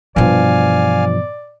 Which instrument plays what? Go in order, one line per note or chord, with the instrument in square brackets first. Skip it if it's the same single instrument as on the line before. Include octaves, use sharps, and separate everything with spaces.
[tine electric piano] G2 F3 [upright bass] B2 E3 [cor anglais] D5 [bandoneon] F5 G#5 F6